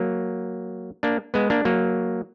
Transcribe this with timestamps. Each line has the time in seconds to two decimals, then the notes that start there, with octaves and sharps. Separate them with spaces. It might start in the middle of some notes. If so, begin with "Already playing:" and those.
Already playing: F#3 A#3
1.03 A#3 D4
1.34 G#3 B3
1.50 A#3 D4
1.65 F#3 A#3